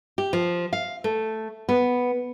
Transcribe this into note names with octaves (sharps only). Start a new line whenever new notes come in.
G4
F3
F5
A3
B3